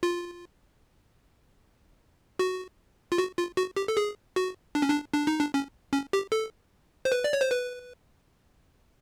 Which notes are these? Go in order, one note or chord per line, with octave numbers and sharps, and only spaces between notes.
F4
F#4
F4
F#4
F4
F#4
G4
A4
G#4
F#4
D4
C#4
D4
D4
D#4
D4
C#4
C#4
G4
A4
C5
B4
D5
C#5
C5
B4